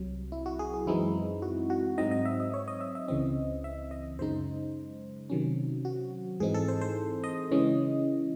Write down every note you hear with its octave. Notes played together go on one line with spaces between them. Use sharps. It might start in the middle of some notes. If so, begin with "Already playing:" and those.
Already playing: C2 C3 F#3
E4
F#4
G#4
G#4
F#2 E3 G#3 C4 D#4 E4
F#4
F#4
G#2 F#3 C4 D#4 D#5
D#5
E5
D#5
C#5
D#5
E5
E5
C#2 C#3 E3 C4 D#5
E5
D#5
F#2 C#3 G#3 D#4 C5
C3 D#3 F#3 C#4
F#4
G#2 E3 C4 D#4 G#4
A4
C5
C5
D#5
C#3 E3 G#3 C#4